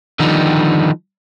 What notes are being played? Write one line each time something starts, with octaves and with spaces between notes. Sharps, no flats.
D3 D#3 F3 G3 B3 D#4